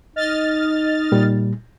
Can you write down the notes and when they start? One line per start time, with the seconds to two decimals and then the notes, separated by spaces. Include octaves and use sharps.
0.16 D#4 D#5 F6 A6
1.12 A#2 G3